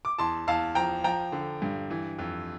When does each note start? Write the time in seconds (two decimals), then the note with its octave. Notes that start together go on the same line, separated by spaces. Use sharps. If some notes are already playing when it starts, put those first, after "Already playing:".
0.05 D6
0.18 E2 A5 C6
0.47 E2 F5 A5
0.75 F3 G5 A#5
1.04 F3 G5 A#5
1.32 D3
1.62 G2
1.90 E3
2.19 F2